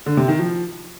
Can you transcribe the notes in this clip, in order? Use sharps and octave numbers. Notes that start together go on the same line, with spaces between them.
D3
C3
D#3
F3